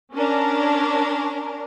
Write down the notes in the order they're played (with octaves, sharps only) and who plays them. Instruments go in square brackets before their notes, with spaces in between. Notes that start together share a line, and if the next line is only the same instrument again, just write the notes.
[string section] C#4 D4 A#4